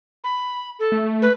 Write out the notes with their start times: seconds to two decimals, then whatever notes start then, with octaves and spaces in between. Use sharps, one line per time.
0.24 B5
0.79 A4
0.92 A3
1.22 B4